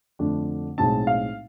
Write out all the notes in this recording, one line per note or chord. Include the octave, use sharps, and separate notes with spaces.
F2 D3 A3 D4
B1 A2 G#3 C4 A5
F5